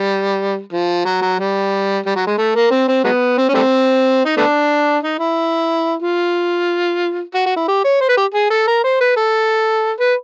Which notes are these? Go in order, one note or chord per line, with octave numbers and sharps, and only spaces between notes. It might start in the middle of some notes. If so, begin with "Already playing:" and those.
Already playing: G3
F3
F#3
F#3
G3
G3
F#3
G#3
A3
A#3
C4
C4
F#3 G#3 B3
C4
C#4
G3 A3 C4
D#4
A3 B3 D4
D#4
E4
F4
F#4
F#4
E4
G4
C#5
C5
B4
G4
G#4
A4
A#4
C5
B4
A4
B4